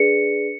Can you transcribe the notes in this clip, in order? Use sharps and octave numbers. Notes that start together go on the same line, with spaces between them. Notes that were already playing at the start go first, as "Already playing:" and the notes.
Already playing: D4 G#4 B4 D5 C#7